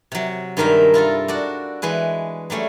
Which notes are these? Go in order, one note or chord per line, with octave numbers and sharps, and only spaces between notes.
C3 F#3
G2 D#3 G#3 A#4 E5 A#5
E4 F4 A4 A#4
D4 F#4 D5
E3 G#3 G#4 B4
F#3 G3 A3 C#4